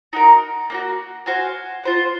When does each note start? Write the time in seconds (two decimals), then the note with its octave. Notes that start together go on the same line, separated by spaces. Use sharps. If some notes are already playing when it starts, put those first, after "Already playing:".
0.13 D#4 F#4 A#4
0.70 A#3 D#4 F#4
1.26 F#4 C5 F5 G#5
1.84 F4 C5 F#5